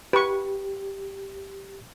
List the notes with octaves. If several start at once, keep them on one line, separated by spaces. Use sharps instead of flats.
G4 B4 C#6